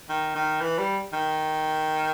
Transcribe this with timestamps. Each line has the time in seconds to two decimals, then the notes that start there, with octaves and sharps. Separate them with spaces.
0.09 D#3
0.35 D#3
0.61 E3
0.78 G3
1.13 D#3